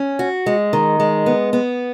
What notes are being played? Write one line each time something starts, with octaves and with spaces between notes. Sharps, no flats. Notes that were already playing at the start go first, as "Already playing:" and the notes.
Already playing: C#4
F#4
G#3
D#3
G#3
B3
B3